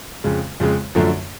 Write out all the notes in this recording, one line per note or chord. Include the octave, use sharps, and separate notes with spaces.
F2 C#3 G#3
F2 C#3 G#3
F#2 D3 F3 A3